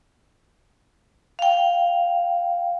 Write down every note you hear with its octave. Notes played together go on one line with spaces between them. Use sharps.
F5 G5